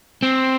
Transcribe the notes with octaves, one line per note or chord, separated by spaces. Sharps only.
C4